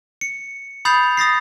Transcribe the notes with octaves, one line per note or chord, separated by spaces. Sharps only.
C#7
B5 D#6 G6 A6 C7 F7
D#6 A6 A#6 C7